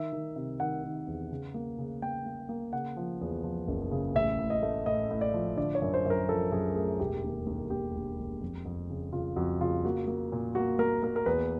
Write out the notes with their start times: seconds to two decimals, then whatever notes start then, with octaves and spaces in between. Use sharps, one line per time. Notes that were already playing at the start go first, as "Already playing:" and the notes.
Already playing: D#3 E5
0.13 D#3
0.36 C3
0.60 D#3 F#5
0.84 D#3
1.07 E2
1.31 C#3
1.54 A#3
1.78 C#3
2.02 A#3 G5
2.26 A#3
2.49 A#3
2.73 C#3 F#5
2.97 F3
3.21 E2
3.44 F3
3.68 F#1
3.91 C#3
4.15 A1 E5
4.39 A2
4.50 D#5
4.63 A3
4.86 A2 D#5
5.11 A2
5.21 D5
5.34 F3
5.57 D3 D5
5.75 C#5
5.82 F#2
5.94 C5
6.06 F#2 A#4
6.29 F3 A4
6.52 F#2 G#4
6.75 A3 G#4
7.00 E1 G4
7.24 D#2
7.47 D#2
7.70 D#2 G4
7.95 E1
8.19 E1
8.41 F2
8.65 F2
8.90 C#3
9.13 C#3 F4
9.36 F2 F#4
9.60 C#3 F4
9.85 A#3 F#4
10.07 A#3
10.32 A#2
10.55 A#3 F#4
10.79 A#3 A#4
11.03 A#3 A#4
11.16 A#4
11.26 E2 B4